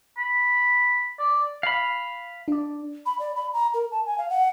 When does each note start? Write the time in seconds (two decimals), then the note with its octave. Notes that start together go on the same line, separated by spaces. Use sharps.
0.18 B5
1.19 D5
1.63 F5 B5
2.48 D4 D5
3.06 B5
3.19 D5
3.35 B5
3.54 A#5
3.74 A#4
3.92 A5
4.06 G#5
4.18 F5
4.30 F#5